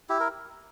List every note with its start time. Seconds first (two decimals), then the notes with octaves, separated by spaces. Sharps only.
0.09 E4 G4
0.20 A#4